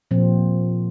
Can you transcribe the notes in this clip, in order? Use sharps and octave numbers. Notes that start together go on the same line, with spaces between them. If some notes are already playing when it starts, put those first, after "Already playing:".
A#2 F3 C4